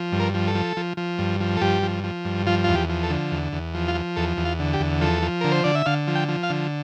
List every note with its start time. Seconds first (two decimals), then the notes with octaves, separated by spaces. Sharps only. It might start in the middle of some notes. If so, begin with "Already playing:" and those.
Already playing: F3
0.12 G2
0.20 A#4
0.34 F3
0.48 A4
0.55 F3
0.77 F3
0.97 F3
1.19 G2
1.40 F3
1.57 A4
1.61 G2 G4
1.83 F3
2.04 F3
2.25 G2
2.47 F3 F4
2.64 E2 F4
2.75 G4
2.89 F3
3.03 A4
3.10 D3
3.31 E2
3.52 E2
3.74 F3
3.88 F4
3.95 F3
4.16 E2 A4
4.37 E2
4.45 F4
4.59 D3
4.73 G4
4.80 E2
5.01 F3 A4
5.22 F3
5.41 D3 A#4
5.52 C5
5.64 D3 D5
5.75 E5
5.86 D3 F5
6.07 F3
6.15 G5
6.28 F3
6.43 F5
6.50 D3